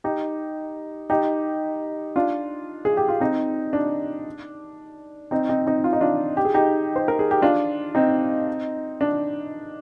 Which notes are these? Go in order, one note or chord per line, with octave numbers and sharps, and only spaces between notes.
D#4 G4
D#4 G4
D4 F4
G#4
G4
F4
C4 D#4
D4
C4 D#4
C4 D#4
C4 D#4
F4
D#4
D4 F4
G4
G#4
D#4 G4
C5
A#4
G#4
G4
D4 F4
C4 D#4
D4